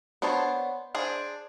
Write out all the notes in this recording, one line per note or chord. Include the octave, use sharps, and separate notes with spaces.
B3 D4 C5 C#5 A5
D4 G#4 C5